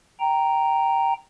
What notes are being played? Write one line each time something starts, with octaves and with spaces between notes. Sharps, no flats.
G5 A#5